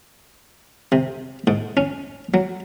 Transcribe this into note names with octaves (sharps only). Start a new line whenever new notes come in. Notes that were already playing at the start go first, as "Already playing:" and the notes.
C3
G#2
C#4
F#3